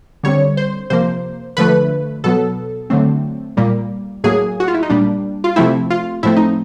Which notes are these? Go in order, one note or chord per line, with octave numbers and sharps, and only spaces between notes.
D3 G3 C4 C#5
C5
C3 F3 A#3 C5
D3 F3 A3 B4
B2 F#3 B3 A4
D3 F#3 A3 C4
A#2 G3 A#3
A2 F#3 A#3 G#4
F#4
F4
E4
D#4
A#2 G3 A#3 D4
F4
C3 F3 A3 C4 E4
F4
A2 F3 A3 C4 E4
D#4